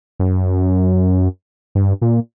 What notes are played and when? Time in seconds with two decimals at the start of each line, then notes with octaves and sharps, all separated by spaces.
0.20 F#2
1.75 G2
2.02 A#2